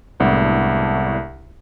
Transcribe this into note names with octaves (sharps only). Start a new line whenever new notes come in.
C2 A2 G#3 B3 D4 F#5